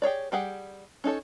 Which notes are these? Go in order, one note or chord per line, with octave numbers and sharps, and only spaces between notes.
G4 G#4 C#5 D5
G3 G4 G#4 F#5
C#4 D#4 A4 C#5